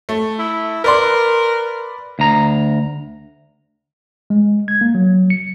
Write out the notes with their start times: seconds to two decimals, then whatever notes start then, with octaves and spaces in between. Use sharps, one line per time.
0.09 A3
0.39 E4
0.84 A#4 B4 D5 C6
2.19 D2 A#5
4.30 G#3
4.68 G#6
4.81 A#3
4.95 F#3
5.30 C#7